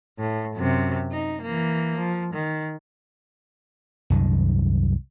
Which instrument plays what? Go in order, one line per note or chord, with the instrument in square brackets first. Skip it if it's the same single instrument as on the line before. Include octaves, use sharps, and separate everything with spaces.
[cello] A2
F#2 C3
D#4
E3 A#3
F3
D#3
[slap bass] C2 F#2 D#3